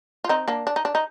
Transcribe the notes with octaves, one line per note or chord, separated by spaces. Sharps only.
F4
C4 D#4
A#3 D4
D4
D#4
D4
D#4